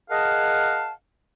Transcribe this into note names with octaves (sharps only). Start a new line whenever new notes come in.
G#4 A#4 D#5 F5 F#5 A5